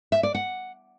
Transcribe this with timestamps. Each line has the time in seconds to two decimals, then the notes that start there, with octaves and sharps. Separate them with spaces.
0.12 E5
0.23 D5
0.35 F#5